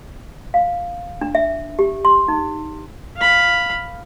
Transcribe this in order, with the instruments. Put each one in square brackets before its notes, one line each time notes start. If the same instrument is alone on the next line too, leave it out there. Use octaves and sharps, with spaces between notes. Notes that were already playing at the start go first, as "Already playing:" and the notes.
[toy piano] F5
D4
E5
G4
C6
D#4
[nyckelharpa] F5 B5